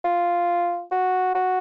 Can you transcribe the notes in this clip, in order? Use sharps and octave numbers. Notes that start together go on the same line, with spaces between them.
F4
F#4
F#4